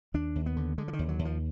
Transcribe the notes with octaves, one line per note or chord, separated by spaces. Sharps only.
D#2 D4
D#2
B3
D3
D3 G#3
F3
D#3
D#2
F#3
D#2
F3